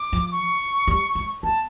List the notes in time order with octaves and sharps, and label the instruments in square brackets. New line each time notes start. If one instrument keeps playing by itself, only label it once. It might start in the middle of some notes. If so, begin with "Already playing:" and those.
Already playing: [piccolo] D6
[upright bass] F3
[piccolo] C#6
[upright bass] G3
G#3
[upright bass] B3 [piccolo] A5